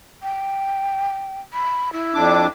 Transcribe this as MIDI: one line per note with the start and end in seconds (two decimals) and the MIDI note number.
0.23 1.41 79
1.53 1.92 83
1.93 2.47 64
2.14 2.47 41
2.14 2.47 62
2.14 2.47 86